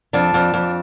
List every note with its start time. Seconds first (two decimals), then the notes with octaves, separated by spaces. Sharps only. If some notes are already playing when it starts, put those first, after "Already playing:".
0.13 F2 D4
0.34 F2
0.54 F2